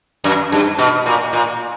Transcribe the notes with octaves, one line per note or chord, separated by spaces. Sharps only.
F#2
G2
B2
A#2
A#2